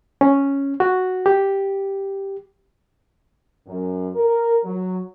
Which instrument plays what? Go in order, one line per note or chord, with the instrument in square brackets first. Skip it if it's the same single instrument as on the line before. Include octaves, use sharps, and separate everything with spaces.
[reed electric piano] C#4
F#4
G4
[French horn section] F#2
A#4
F#3